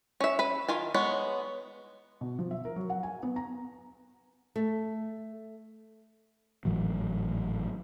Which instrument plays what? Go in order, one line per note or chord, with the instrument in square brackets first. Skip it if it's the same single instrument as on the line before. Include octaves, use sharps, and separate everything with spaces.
[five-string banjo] C#4 E5
B4 B5
D#3 F4 G#5
G#3 B3 C#5
[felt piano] B2
F3
E5
A#4
F#3
F#5
G#5
B3
A#5
[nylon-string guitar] A3
[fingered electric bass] G#1 A2 E3 F#3